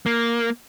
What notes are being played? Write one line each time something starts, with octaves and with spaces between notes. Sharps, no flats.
A#3